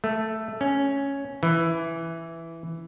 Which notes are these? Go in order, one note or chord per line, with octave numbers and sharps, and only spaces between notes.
A3
C#4
E3